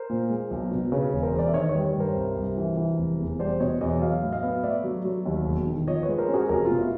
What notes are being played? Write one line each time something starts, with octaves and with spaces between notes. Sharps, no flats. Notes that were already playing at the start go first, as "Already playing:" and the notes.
Already playing: A#4 C5
A#2
G#3
B1
B2
C#3 B4 C#5
E1
A#4 C5
E2
C5 D5
E5
D#3 C#5 D#5
B4 C#5
G3
B4 C#5
G2
A#4 C5
C2
C2
E3
E3
F1
E2
G3 C5 D5
B2 C#5 D#5
E2 C#5 D#5
F#3 D#5 F5
A2
D#5 F5
B3
A3 D5 E5
F#3
F#3
D#2
E1
D#3
F3 C#5 D#5
B4 C#5
G#3
A#4 C5
C#4
F#4 G#4
F1 G#4 A#4
F4
B2
E4 F#4